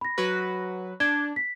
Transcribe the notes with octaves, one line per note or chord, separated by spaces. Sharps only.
B5 A#6
F#3 F#4 B4
D4 G#6 G7
B6